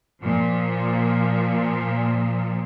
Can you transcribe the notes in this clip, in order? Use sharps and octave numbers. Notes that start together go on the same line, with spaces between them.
A#2 F3